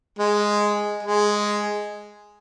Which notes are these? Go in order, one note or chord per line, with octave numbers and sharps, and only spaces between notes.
G#3
G#3